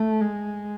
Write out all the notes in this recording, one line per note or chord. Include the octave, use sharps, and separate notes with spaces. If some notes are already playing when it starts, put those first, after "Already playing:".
Already playing: A3
G#3